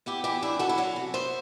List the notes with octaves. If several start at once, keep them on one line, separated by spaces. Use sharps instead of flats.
B3 E4 G4
E3 E4 G4
D4 E4
F#2 F#4 A4
E4
F#3 F#4
C3
B3 C5 E5